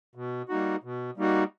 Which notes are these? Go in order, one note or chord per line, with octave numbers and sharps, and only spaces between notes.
B2
G3 A#3 D#4 F#4
B2
G3 A#3 D#4 F#4